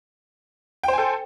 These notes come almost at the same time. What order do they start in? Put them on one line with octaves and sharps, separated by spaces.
G5 C5 G#5 A4